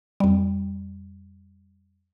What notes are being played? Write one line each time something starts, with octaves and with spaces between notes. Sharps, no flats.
F2 G3